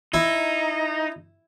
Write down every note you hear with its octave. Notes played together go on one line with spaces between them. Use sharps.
D#4 E4